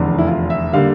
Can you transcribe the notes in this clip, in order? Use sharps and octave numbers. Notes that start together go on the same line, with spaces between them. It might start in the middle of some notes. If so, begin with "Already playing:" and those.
Already playing: F1 E2 D3
E4
F4
E5
D3 G3 A#3 F5